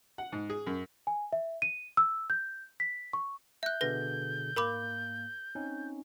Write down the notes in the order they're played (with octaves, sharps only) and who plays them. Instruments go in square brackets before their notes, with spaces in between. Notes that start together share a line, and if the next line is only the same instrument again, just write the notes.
[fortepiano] F#5
G#2
G#4
F#2
[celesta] G#5
E5
D#7
E6
G6
B6
C#6
[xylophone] E5 F#6 [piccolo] G6
[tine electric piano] B2 D3 G#4 [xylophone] B4 A#6
[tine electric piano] G#2 A#3 [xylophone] A#4 B5 D6
[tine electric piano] C4 C#4 D#4